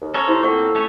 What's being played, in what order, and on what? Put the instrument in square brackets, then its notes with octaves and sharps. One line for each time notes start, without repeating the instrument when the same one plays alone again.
[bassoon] D#2
[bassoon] C#4 [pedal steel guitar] A4 A#4 C#5
[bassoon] C3 [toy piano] E4 F4 [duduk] C5
[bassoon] A2 [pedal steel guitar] A#3 C4 [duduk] A4 [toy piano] F#5 G5 C#6
[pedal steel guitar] A3 C#4 C#5